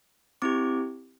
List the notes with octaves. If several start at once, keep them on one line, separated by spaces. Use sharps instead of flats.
C4 E4 G4 D6